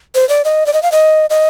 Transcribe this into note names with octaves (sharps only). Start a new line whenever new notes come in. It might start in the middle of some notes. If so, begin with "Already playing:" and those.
C5
D5
D#5
D5
D#5
F5
D#5
D#5